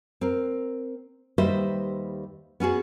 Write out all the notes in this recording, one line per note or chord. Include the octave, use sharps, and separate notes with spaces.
C4 A#4
D#2 G3 B4 C5 D#5 E5
B3 C#4 F#4 G#4